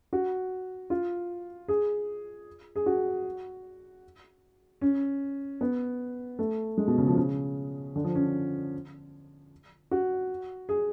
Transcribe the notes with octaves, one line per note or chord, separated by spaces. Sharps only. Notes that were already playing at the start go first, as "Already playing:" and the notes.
F#4
F4
G#4
G#4
F#4
C#4
B3
A3
G#3
B2
C#3
F3
C#3
D3
F3
C#4
F#4
G#4